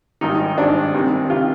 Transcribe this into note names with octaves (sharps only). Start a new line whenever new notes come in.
G#1 G2 D#3 D#4
G#1 G2 D#3 D4
C2 C3 D#3
C3 D#3 F4